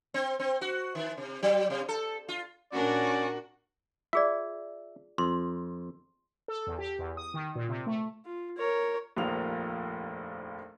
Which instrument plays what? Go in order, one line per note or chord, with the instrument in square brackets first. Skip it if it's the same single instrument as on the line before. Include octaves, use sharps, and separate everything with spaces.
[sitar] C4
C4
F#4
D#3
C3
F#3
C3
A4
F4
[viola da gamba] A#2 D4 A#4 [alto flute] C#4 [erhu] F#4 [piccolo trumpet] D5
[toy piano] F4 G#4 D5 [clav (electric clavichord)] E5
[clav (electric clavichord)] F2 [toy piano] C6
[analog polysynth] A4
E2
G4
E2
D#6
D#3
A#2
C3
A3
[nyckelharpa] F4
A#4 C#5
[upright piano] F1 A#1 D#2 F3 A#3 F7